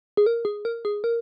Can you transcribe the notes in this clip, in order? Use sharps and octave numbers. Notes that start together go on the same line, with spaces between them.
G#4
A#4
G#4
A#4
G#4
A#4